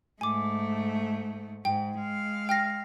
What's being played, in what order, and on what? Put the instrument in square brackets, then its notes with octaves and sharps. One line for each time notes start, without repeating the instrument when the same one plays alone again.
[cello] G#2 A3 [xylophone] G#5 D6
[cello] G#2 [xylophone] G5
[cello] G#3 F5
[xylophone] G5 F6 A#6